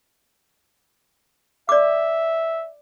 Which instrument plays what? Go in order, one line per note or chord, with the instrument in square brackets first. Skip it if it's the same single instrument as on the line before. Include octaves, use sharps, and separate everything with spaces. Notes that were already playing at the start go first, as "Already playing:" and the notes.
[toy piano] D5 D6 [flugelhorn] E5